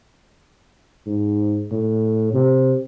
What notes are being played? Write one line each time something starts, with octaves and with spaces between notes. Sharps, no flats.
G#2
A2
C3